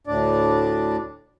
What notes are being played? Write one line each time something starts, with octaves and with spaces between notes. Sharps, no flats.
D2 A2 D4 D5